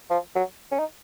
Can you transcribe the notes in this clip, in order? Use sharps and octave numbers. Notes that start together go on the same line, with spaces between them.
F3
F#3
C#4
D#4